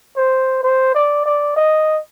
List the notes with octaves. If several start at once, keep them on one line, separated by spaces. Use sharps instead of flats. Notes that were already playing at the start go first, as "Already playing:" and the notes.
C5
C5
D5
D5
D#5